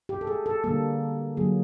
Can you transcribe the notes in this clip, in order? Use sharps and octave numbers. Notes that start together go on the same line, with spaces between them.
G4
A4
G#4
A4
D3 G3 A#3 A4
D3 F#3 A#3 G#4